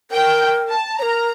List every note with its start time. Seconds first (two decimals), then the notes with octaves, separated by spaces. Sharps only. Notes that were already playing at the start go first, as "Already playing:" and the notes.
0.11 A#4 G5
0.70 A5
0.99 A#4 C#5 A#5